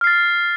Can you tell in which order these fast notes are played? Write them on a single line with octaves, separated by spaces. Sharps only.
F6 C7 A6